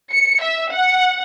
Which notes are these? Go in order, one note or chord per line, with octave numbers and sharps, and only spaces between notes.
C#7
E5
F#5